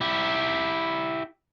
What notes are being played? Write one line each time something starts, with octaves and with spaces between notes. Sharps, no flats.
E4 G4